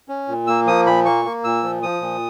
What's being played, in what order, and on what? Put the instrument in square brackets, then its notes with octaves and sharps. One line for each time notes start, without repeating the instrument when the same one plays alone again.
[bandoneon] C#4
A#2
A#3 E6
F3 D#6
A#2 B5
A#3 C#6
A#3
A#2 E6
F3
F3 D#6
A#2